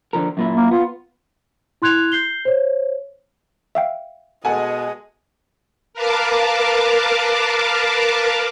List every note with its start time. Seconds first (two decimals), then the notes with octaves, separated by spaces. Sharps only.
0.13 D3 F3 A#4
0.37 F#2 A#2 E4
0.56 A#3
0.71 B3 F4
1.82 E4 C6 F#6 G#6 F7
2.12 G6 C7 G7
2.45 C5 C#5
3.75 E5 F5 G5
4.45 B2 G#3 A4 D#5 F#5 G#5
5.94 A#4 B4 F5 A5 D6